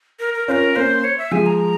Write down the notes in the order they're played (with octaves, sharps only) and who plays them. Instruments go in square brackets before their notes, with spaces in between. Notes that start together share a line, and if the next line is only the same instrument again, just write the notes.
[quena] A#4
A#4
[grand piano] C#4 F4 [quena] A#4 C5
[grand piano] A#3 C#4 [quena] C5
[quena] C#5
E5
[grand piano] F3 G#3 [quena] G#5
[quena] A#5